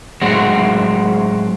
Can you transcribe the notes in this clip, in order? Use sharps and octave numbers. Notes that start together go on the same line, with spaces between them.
A2 F#3 G#3 C4 F#4